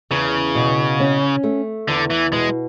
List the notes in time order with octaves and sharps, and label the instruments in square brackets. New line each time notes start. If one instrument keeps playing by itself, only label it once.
[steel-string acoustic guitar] E2 [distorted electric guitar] C#3
[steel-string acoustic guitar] B2
C#4
A3
[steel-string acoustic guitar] E2 [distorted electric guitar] D3
[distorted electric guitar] E3
[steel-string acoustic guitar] B2 [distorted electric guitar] G#3